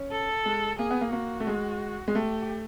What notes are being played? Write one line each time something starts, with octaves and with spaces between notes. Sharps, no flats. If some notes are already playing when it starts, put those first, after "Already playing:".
Already playing: C#4
A4
G#3
A#3 G#4
B3
A#3
A#3 F#4
A3
G#3
G#3
A3 G4